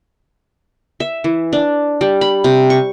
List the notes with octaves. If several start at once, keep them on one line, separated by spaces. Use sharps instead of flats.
E5
E3
D4
G3
B5
C3
C#6